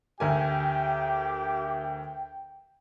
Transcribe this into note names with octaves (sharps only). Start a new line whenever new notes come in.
D2 G4 A#4 G5 G#5